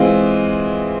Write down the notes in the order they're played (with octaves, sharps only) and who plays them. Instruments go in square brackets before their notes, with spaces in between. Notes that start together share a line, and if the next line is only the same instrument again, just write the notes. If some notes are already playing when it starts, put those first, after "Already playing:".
Already playing: [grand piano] E3 G#3 C4 F4